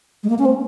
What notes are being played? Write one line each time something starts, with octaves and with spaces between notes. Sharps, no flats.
G#3
A#3
C#4
C4